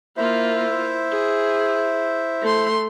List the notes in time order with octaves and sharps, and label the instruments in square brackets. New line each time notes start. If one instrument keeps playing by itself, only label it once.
[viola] A#3 F4 [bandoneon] E4 C5 E5
[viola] G#4
A3 C6